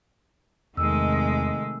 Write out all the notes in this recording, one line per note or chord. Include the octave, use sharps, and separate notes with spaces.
E2 C3 D#3 G#3 A3 E6